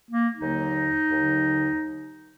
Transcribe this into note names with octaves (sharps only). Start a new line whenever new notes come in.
A#3
D#2 D3 F#3 D#4
D#2 D3 F#3